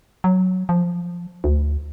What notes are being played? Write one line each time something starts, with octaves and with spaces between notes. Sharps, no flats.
F#3
F3
D2